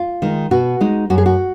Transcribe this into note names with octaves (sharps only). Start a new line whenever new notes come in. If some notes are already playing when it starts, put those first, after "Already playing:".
Already playing: F4
D#3 G#3 D#4
B2 F#4
G#3 D#4
F#2 F#4
G#4
F#4